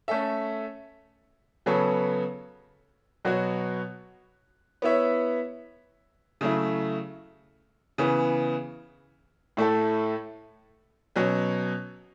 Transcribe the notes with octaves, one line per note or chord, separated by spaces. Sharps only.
A3 C#4 A4 E5
C#3 F#3 B3 A4 C#5
B2 F#3 B3 F#4 C#5
B3 E4 C#5 E5
C#3 F#3 A3 E4
C#3 E3 B3
A2 A3 E4 A4
B2 F#3 C#4